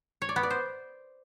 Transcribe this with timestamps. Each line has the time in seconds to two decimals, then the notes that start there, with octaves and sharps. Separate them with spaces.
0.22 C#5
0.29 D5
0.36 B3
0.43 D5
0.50 C5